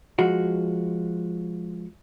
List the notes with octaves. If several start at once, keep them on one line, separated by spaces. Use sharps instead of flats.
F3 G#3 F#4